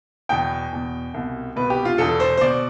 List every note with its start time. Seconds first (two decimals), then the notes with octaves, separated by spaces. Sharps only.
0.29 E2 B2 G5
0.72 E2 B2
1.14 C2 B2
1.56 C2 B2 B4
1.70 G4
1.85 F4
1.98 E2 B2 A4
2.20 C5
2.37 C5
2.41 B2 D5